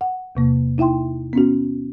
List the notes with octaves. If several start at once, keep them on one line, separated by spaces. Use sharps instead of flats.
F#5
E2 C3 A#3
D#4 E4 E5 G5 C6
B3 C#4 F#4